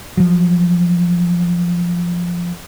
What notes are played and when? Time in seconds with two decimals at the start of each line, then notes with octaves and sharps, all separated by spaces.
0.17 F3 F#3